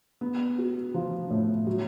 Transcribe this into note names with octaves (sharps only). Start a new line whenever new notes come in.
B3
F#4
F3
A2
F#3